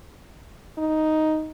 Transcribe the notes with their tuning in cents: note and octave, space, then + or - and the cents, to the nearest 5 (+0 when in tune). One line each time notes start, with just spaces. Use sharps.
D#4 +5